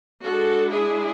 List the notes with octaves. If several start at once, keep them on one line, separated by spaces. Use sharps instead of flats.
G#3 D4 F#4 A4
E4 G#4